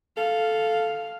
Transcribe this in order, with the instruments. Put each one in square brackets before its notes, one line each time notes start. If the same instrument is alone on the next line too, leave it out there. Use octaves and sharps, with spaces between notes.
[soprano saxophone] A4 [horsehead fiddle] F5